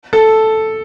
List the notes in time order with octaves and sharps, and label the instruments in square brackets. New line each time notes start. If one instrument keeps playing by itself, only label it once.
[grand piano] A4